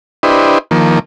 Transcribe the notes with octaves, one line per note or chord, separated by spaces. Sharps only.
D4 E4 G4 B4 C5 D#5
D#3 F3 A#3